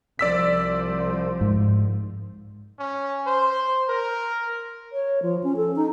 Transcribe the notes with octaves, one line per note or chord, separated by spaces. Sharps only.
C2 F3 D5 E6 B6
G#2
C#4
C5
A#4
C#5
F3
C#4
A4
D#4